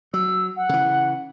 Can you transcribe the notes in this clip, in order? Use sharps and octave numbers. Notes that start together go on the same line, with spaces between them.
F#3 E6
F#5
C#3 E3